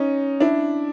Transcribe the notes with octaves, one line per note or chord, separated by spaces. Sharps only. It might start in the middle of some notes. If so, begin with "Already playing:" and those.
Already playing: C#4 D#4
D4 E4